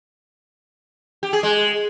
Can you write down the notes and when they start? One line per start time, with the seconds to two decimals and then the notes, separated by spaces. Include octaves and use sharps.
1.23 G4
1.33 G#4
1.43 G#3